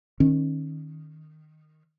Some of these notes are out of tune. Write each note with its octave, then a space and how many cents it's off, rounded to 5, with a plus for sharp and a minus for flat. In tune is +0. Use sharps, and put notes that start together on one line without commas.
D#3 -10 C#4 -25